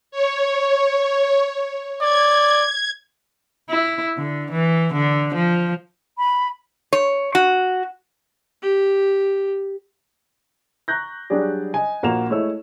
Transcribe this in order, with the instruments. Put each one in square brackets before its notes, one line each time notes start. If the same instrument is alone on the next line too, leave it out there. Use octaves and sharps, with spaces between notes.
[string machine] C#5
[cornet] D5 [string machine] G#6
[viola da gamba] E4
D3
E3
D3
F3
[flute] B5
[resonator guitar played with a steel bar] C#5
F#4
[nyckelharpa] G4
[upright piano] A#5 C#6 F#6 G6 A#6
F#3 G3 D4 G4 G#4 D5
D#5 G#5
A#1 A#3 F#4 E7 F7
G#3 A3 E4 C#5 E6